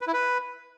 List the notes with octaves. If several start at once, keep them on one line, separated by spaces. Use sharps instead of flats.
B4
E4
B4